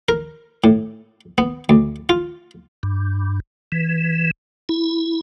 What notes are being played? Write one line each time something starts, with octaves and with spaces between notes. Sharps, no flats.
A#4
A2
B3
D2
F4
G2
E3
E4